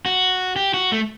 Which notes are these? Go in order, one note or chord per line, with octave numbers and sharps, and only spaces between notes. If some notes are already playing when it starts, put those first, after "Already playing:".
F#4
G4
F#4
A3